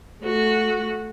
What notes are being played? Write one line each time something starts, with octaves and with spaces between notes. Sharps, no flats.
A3 F#4